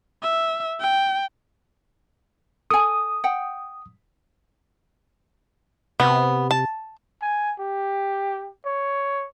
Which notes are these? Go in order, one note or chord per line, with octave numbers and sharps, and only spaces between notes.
E5
G5
A4 G#5 D#6
F#5 G5
C3 B3
A5
G#5
G4
C#5